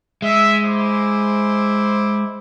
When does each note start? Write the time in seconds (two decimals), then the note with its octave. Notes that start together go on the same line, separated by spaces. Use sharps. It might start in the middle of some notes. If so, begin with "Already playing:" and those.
0.22 G#3 E5
0.63 E4 C5 D6